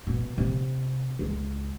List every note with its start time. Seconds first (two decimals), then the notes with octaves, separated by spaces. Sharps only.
0.07 B2
0.38 C3
1.19 C#2